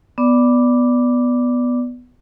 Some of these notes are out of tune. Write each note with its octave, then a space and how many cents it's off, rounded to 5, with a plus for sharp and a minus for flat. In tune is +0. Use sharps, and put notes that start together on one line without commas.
B3 +0 D5 +0 D6 +0